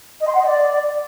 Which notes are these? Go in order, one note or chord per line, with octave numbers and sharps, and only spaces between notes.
D#5
C6
F#5
D#5
D5